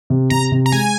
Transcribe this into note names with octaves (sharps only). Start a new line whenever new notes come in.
C3
C3 A#5
C3
A#5
G#3 G#5